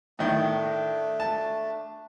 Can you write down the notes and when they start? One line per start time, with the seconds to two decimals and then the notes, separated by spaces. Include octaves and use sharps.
0.19 A2 D#3 A3 D4
1.20 A5